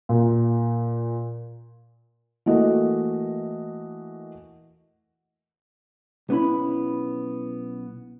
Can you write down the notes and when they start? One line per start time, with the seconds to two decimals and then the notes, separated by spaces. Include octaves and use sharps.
0.09 A#2
2.46 E3 A3 A#3 F#4 D#5
6.29 B1 B3 C#4 E4 B5